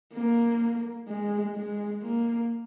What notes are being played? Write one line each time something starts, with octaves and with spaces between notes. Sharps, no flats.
A#3
G#3
G#3
A#3